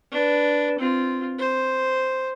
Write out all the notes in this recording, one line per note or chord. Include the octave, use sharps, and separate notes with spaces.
D4 B4
C4 F4
C5